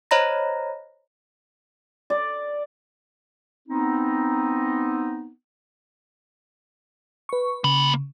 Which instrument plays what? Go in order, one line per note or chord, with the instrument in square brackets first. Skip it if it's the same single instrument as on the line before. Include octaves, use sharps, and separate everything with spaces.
[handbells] C5 C#5 D#5 A#5 B5 A#6
[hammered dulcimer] D5
[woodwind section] B3 C4 D#4
[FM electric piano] B4 C#6
[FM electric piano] C#3 [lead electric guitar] A#3 B5